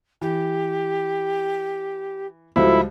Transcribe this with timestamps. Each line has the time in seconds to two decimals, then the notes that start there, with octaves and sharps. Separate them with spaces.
0.21 E3 G4
2.56 C#2 F3 G3 E4 F#4 A4 C5